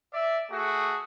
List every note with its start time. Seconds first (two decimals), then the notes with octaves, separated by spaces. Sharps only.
0.12 D5 E5
0.49 A3 F#4 G#4